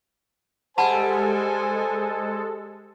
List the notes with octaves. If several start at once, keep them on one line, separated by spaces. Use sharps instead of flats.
G3 G#3 A4 C5 F#5 G#5 A5 B5